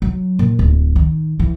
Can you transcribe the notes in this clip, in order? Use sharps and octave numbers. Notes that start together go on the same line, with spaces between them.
F#3
A#2
D1
D#3
E3